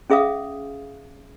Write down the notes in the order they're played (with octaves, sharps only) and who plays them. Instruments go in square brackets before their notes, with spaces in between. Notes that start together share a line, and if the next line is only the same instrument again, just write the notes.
[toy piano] C#4 G#4 E5 F5 D#6